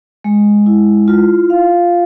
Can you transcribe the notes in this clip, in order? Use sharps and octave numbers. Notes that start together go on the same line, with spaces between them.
G#3
E4
F4
F5